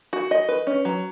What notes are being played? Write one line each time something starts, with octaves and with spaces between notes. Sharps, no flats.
F#4
D#5
B4
C#4
F#3